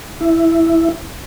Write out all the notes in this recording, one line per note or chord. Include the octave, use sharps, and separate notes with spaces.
E4